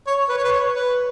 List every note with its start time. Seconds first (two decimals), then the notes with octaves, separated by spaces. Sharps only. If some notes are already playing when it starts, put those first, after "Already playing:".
0.07 C#5
0.29 B4
0.37 C#5
0.44 B4
0.52 C#5
0.75 B4